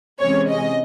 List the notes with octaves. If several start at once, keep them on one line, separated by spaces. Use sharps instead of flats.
C3 E3 G#3 C#4 C#5
D#5